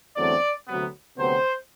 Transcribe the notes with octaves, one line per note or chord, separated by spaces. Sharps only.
E2 D3 F#3 A3 C4 D5
D2 C3 F#3 B3
D2 C3 F#3 B3 C5